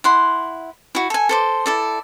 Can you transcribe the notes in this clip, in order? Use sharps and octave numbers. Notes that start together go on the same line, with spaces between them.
E4 F#5 C6
E4 F#4
A4 G#5
A4 C5 D6
E4 A4 D5